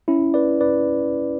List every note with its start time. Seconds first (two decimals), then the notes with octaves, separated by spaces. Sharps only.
0.08 C#4 E4
0.34 B4 D5
0.61 B4 D5